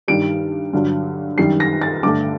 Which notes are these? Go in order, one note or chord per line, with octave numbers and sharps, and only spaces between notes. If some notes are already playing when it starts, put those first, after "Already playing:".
G2 D#3 G3 D7
G2 D3 F#3
F#2 D#3 G3 C7
A#6
A6
G2 D3 A3 D6